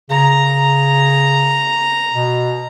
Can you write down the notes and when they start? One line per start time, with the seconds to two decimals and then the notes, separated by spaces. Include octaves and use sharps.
0.10 C#3 A#5
2.14 B2